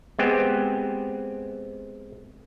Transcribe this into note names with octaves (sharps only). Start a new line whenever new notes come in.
G#3 B3 C4 G4